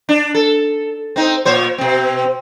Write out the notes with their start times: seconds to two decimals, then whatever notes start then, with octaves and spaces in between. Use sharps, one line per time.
0.09 D4
0.35 A4
1.16 C4 D#4
1.45 A#2 C5 C#5
1.78 B2 C4